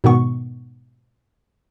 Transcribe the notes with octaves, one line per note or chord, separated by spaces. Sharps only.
G#2 B2 D#3 B3 C#6